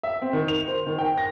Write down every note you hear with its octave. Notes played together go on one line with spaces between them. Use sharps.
E5
C4
D#3
F7
C5
D#3
G5
A#6